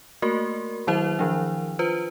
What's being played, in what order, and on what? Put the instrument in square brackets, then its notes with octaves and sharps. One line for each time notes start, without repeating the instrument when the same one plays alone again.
[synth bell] A3 A#3 F#4 A#4
D#3 F#3 E4 C5 E5 F7
D#3 F3 D4
F4 B4 C5